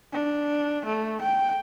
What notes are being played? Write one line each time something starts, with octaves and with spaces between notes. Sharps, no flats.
D4
A3
G5